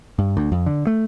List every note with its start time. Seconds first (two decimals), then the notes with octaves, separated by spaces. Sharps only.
0.19 G2
0.37 D2
0.52 F2
0.66 D3
0.87 A3